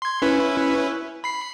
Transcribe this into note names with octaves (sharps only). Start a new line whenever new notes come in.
C6 G#6
C#4 E4 B4
B5 C7